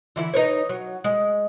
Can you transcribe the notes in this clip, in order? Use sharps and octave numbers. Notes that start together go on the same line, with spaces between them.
D3 E3 E4
D#4 B4 C#5
F#3
G#3